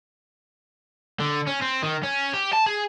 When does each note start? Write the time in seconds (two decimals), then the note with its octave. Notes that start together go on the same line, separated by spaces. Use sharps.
1.20 D3
1.47 C#4
1.61 C4
1.83 D#3
2.03 C#4
2.33 G4
2.53 A5
2.66 G#4